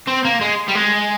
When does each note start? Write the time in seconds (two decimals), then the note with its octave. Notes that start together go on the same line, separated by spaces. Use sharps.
0.08 C4
0.25 A#3
0.41 G#3
0.68 G3
0.75 G#3